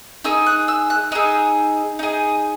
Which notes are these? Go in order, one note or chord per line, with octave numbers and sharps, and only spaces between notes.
D#4 G#4 E6
F#6
E6
F#6
D#4 G#4 E6
D#4 G#4